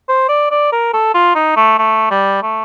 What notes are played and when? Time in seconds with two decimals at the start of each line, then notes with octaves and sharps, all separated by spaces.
0.09 C5
0.29 D5
0.51 D5
0.72 A#4
0.93 A4
1.14 F4
1.35 D#4
1.56 A3
1.78 A3
2.11 G3
2.43 A3